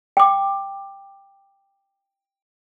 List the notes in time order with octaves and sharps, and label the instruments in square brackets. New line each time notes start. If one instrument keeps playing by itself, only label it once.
[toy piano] G5 D6